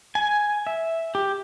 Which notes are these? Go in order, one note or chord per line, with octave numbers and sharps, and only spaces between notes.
G#5
E5
G4